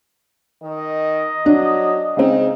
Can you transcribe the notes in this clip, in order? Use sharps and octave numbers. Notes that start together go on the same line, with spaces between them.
D#3 D#5
F#3 D4
C#3 G#3 C4 D#4